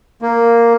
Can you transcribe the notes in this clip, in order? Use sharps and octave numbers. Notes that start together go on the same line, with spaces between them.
A#3